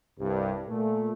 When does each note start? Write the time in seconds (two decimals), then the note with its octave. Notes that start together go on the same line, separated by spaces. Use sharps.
0.18 C2 G2
0.68 A#2 A3